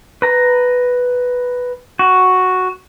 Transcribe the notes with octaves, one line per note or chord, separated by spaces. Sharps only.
B4 A#5
F#4